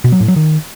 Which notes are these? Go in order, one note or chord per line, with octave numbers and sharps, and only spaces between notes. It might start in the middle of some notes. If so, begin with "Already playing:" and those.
B2
F#3
A2
F#3
D#3